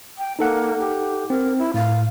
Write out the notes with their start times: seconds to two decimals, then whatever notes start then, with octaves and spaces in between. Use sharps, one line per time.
0.18 G5
0.39 A#3 D#4 A4 F#5
0.79 G4
1.30 C4 A#4
1.59 E4
1.74 A2 F5